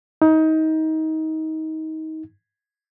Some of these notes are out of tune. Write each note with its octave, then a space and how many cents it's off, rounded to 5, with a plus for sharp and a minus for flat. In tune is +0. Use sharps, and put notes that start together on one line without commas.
D#4 +25